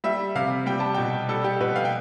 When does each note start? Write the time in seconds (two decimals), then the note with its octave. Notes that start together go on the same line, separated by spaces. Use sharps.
0.04 G3 E5
0.35 C3 F5
0.66 G3 G5
0.80 A5
0.95 B2 G5
1.29 G3 A4
1.44 G4
1.61 B2 B4
1.76 F5
1.85 G5